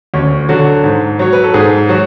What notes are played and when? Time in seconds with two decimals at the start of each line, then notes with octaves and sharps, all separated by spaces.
0.14 D2 C#4
0.49 D3 F#3 F#4
0.84 G#2
1.19 F#3 C#5
1.33 B4
1.44 A4
1.54 G#2 G#4
1.89 F#3 F#4